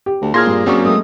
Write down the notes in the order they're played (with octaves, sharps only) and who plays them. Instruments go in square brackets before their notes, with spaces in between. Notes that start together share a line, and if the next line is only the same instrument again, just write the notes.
[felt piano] G4
[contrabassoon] D2
[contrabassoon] A#2 [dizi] G#4 [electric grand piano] C6 [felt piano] F6 G#6 A#6
[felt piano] G2
[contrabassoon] F#2 [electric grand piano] F#3 A#3 C4 [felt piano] D4 C#6
[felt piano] G#3 A3 [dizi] D#6